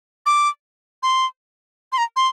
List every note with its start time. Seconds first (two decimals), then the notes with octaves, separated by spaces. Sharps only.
0.26 D6
1.03 C6
1.92 C6
1.98 A#5
2.16 C6